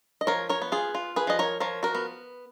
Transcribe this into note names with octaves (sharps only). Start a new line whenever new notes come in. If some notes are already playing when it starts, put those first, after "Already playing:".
D#5
F3 A#4 C#5
A#4 C#5
B3
F4 G#4
F4
G#4 B4
F3 D#5
A#4 C#5
F3 A#4 C#5
F#4 A#4
B3